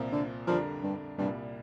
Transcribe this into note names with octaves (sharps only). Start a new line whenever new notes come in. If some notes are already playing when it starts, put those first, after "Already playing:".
Already playing: C2 A#2 F3 C4 A#4
D3
F2 D3 F3 G3 D4 A#4
G2
C2 G2 A#2 G3